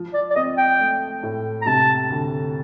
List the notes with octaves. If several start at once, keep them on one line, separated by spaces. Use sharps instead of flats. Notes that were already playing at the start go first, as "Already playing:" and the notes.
Already playing: F3
D5
D5
C4 D#5
G5
A3
A2
A#5
C3 A5
D2